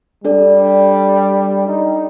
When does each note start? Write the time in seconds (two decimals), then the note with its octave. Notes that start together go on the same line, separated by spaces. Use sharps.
0.24 G3 D4 A4 D5
1.67 D#4